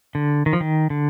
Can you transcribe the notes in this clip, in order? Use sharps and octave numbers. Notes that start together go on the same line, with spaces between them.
D3
D#3
F3
D#3
D3